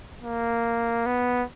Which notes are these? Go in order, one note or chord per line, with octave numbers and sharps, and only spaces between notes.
A#3
B3